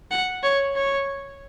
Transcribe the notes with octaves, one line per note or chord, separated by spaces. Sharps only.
F#5
C#5
C#5